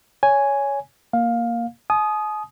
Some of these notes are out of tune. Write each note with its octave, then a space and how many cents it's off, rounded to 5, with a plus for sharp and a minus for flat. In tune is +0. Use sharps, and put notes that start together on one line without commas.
C#5 +15 G#5 +0
A#3 +0 F5 +15
G#5 +45 D#6 +0